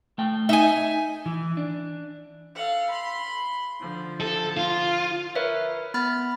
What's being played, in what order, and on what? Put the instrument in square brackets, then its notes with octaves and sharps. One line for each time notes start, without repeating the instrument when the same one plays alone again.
[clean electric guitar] A3 G5
[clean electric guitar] D#4 D#5 [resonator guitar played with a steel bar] E5 G#5
[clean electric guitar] E3
D4
[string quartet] A4 F5 F#5
B5 C6
D3 F3
[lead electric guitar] A4
F4
[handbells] A#4 B4 C#5 E5
B3 B5 F6 A6